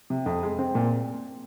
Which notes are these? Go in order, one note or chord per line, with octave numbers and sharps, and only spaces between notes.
C3
F2
G#3
C4
A#2